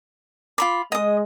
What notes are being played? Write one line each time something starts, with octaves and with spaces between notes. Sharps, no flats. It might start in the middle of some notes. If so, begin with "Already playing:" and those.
F4 B5 D6
G#3 D#5 D#6